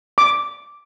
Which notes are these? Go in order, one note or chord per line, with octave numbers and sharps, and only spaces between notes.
D6